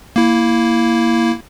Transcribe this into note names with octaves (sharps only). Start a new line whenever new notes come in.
A#3 E4